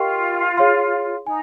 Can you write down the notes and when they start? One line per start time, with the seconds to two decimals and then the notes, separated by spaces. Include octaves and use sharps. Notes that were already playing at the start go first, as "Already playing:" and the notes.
Already playing: F4 G4 A#4 D#5 G5 C#6
0.57 G#4 C#5 F5 C6
1.26 D#4 G#5